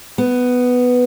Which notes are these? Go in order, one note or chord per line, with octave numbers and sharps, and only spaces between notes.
B3